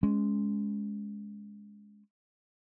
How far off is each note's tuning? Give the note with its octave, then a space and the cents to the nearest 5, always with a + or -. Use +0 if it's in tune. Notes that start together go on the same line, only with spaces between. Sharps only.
G#3 +0 C#4 +10